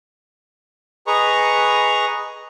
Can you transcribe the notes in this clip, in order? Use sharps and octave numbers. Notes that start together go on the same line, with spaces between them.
G#4 B4 D#5 A#5 C#6